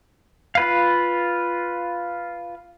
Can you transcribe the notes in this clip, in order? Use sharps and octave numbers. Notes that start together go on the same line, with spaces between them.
F4 B4 F5